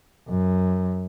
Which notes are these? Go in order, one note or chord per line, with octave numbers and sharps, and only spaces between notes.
F#2